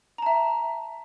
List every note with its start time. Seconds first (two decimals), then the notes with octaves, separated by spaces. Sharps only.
0.18 A#5
0.22 A5
0.26 E5